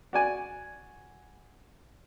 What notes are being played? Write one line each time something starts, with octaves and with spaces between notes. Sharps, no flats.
F#4 D5 G#5